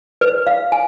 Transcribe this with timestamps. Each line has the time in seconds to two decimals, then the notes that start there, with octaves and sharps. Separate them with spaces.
0.21 B4
0.47 F5
0.72 G#5